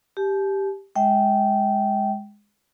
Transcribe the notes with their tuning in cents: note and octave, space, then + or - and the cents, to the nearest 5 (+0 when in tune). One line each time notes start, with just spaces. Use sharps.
G4 +0 A5 -45
G#3 -5 E5 -30 G5 -20